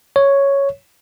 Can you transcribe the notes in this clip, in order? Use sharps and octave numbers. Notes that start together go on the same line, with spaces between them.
C#5